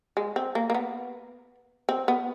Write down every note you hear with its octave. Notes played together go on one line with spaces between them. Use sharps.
G#3
C4
A#3
A#3
B3
C4
B3